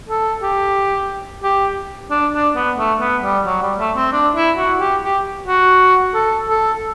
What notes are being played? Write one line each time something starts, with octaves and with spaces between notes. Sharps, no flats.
A4
G4
G4
D4
D4
B3
A3
B3
G3
F#3
G3
A3
C4
D4
E4
F#4
G4
G4
F#4
A4
A4